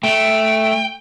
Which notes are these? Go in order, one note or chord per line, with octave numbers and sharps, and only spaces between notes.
A3 G5